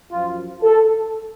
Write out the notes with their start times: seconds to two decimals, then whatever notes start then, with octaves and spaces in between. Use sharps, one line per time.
0.12 F#2 F3 F4
0.62 A4